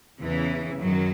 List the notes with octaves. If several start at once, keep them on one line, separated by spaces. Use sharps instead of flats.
E2 C#3 E3
F#2 D#3 F#3